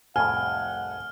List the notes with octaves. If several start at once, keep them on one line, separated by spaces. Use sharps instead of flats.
C2 F2 A2 F#5 G#5 F6